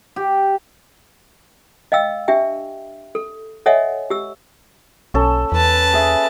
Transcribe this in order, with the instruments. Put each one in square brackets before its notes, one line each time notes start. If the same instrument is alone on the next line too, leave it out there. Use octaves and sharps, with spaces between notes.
[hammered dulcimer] G4
[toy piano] D#5 F5 G5 E6
D4 G4 E5 G5
A4
A4 C#5 D#5 E5 F#5 G#5
G4 E6
[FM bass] B1 [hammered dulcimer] C#4 A4
[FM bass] E2 [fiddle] B4 A5
[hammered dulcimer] G#4 E5